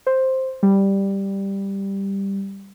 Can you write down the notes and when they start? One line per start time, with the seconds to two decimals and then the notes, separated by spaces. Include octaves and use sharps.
0.07 C5
0.63 G3